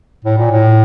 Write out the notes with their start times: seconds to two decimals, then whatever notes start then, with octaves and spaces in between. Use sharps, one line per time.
0.25 A2
0.38 A#2
0.51 A2